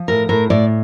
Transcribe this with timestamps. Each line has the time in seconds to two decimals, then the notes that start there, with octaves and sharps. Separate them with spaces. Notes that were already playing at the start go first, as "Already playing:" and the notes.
Already playing: F3
0.08 A2 A#4
0.29 A2 A#4
0.50 A2 D5